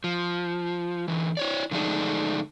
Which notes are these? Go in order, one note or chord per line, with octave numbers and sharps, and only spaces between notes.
F3
D3 E3
E4 C#5 D5
D3 F3 G#3 A3 D4 D#4